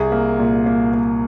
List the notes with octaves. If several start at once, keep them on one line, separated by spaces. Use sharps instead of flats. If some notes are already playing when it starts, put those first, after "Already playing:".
Already playing: C2 G#4
A#3
A#2
A#3
A#3